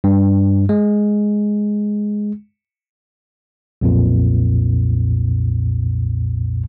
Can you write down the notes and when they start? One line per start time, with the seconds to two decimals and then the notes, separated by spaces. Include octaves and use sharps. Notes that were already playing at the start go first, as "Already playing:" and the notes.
0.04 G2
0.69 G#3
3.81 B1 F2 A#2